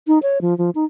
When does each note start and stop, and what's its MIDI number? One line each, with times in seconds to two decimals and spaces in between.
0.07 0.19 63
0.23 0.41 73
0.41 0.56 53
0.58 0.70 53
0.75 0.85 63